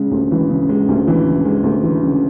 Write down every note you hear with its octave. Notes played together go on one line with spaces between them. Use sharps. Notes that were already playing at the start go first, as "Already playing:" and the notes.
Already playing: C#3 G#3
D2
E3
C#3
G#3
D2
E3
C#3
G#3
D2
E3
C#3